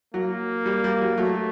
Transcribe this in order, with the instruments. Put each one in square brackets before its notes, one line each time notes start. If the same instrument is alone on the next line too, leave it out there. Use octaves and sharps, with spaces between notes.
[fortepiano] F#3 [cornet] A#3
[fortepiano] G3
G3
F#3
[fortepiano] F#3 [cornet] A3